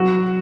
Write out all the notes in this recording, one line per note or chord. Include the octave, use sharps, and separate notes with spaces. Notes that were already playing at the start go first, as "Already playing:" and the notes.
Already playing: F#3 F#4